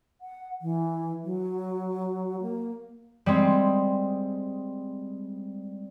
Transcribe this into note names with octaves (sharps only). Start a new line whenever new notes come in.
F#5
E3
F#3
A#3
G3 G#3 C4